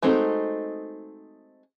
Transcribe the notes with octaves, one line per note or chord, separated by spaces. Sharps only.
G#3 A3 C4 D#4 F#4